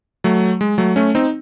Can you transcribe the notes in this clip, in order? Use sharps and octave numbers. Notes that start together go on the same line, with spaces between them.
F#3 A3
G#3
F#3 A3
A3 C#4
C4 D#4